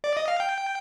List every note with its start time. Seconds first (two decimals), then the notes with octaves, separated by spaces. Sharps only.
0.04 D5
0.17 D#5
0.28 F5
0.40 G5